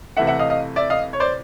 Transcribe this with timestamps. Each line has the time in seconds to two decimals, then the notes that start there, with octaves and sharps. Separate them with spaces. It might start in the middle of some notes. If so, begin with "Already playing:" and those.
0.17 C3 E3 A3 E5 F#5
0.27 E5 F#5
0.39 D#5 F5
0.50 D#5 F5
0.76 D5 E5
0.90 D#5 F5
1.13 C#5
1.20 C5 D5